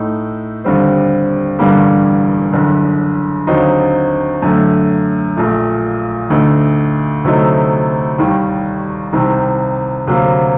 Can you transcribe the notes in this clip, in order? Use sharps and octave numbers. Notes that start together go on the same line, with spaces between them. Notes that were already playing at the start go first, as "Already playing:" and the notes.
Already playing: A2 A3 D#4
D#2 D3 G3 C4
A1 G2 D3 G3 A#3
F#1 F#2 D3
D#2 D3 F#3 C4 D#4
F#2 D3 A3
A#1 A#2 A3
D2 D3 A3 D#4
D2 C3 F#3 A3 D#4
D#2 D#3 G3
C2 C3 D#3
D2 C3 F#3 A#3